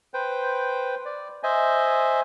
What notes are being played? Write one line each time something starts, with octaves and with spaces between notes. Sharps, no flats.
B4 C5 G5
D5
C5 D#5 E5 G#5